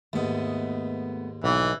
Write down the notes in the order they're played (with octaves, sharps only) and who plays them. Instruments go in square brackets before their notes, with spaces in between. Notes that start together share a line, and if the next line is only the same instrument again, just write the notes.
[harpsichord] D#2 G#2 [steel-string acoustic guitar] A3 B3 D#5
[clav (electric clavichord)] B1 [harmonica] E3